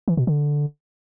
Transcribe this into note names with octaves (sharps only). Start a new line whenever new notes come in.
E3
B2
D3